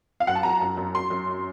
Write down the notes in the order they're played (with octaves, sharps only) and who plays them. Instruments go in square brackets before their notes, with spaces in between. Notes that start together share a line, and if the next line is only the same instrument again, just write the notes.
[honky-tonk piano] F5
F#2 F#5
A5
F#2 A#5
F#2
F#2
F#2 C6
F#2